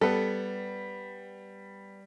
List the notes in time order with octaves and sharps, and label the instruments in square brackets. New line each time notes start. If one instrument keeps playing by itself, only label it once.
[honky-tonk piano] G3 [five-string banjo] B3 A4